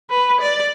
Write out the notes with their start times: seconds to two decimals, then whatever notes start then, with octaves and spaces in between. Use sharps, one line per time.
0.10 B4
0.41 D5